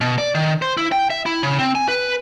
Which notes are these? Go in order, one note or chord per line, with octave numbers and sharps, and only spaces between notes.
B2
D5
D#3
C5
E4
G5
E5
E4
C#3
C4
G#5
B4